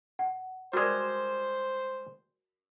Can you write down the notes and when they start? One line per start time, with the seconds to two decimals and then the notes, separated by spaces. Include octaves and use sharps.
0.19 F#5
0.73 G3 G#3 F#4 A#4 C5 D5